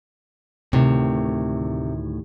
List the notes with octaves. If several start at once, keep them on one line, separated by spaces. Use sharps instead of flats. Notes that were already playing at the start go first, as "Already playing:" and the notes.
D2 A2 C3 D#3